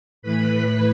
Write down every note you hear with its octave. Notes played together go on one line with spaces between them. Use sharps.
A2 E3 B4 B5